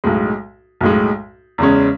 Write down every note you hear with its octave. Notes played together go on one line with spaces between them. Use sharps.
B1 A2 G#3
B1 A2 G#3
E2 C#3 G#3 C#4